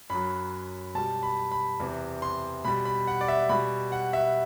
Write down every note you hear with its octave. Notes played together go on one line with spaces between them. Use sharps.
F#2 F#3 B5
B2 G3 A5
B5
B5
E2 C3 E3
C6
B2 G3 B5
B5
F#5
D5
E5
B2 G3 B5
F#5
E5